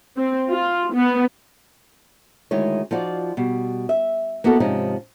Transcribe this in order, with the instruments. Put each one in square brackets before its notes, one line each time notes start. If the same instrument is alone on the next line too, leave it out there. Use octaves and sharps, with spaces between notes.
[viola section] C4
F4
B3
[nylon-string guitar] D2 D#3 G#3 E4 C#5
F3 D#4 F4 F#4 D5
B2 G3
E5
A#3 B3 E4 F#4 A4
G#2 C3 F3 G#3 C#4 D#4